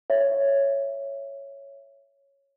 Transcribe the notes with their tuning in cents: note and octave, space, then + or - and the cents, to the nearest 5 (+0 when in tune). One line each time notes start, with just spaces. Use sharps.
C#5 +0 E5 +10